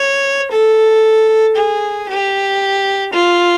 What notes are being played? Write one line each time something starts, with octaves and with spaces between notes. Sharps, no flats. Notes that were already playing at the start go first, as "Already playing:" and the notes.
Already playing: C#5
A4
G#4
G4
F4